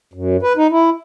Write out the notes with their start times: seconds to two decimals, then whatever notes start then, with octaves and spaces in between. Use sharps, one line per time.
0.14 F#2
0.42 B4
0.57 D#4
0.71 E4